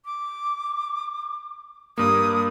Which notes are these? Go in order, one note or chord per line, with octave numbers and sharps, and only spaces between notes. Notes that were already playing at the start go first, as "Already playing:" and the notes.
D6
G2 A#3 D#6